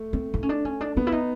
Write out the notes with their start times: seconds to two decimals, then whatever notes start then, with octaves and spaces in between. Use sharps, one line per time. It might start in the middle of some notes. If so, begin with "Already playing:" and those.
Already playing: A3
0.13 C4
0.34 D#4
0.43 C#4
0.49 D4
0.65 C#4
0.81 D4
0.97 B3 D4
1.07 E4
1.12 D#4